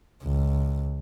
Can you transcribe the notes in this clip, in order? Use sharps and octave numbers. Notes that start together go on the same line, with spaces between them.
C#2